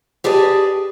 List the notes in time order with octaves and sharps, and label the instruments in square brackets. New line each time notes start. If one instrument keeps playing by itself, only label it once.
[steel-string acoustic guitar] G4 G#4 B4 D5 A5